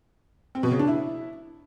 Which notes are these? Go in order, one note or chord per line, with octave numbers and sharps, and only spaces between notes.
C4
B2
C#3
D4
E4